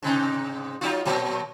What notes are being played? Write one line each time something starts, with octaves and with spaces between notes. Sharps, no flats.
G#2 C3 D#4
F#3 D#4 F4
A#2 F#3